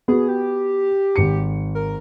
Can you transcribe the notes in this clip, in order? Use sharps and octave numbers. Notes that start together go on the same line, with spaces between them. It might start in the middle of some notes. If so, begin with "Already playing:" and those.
B3 F#4 G#4
G4
G#1 C#7
A#4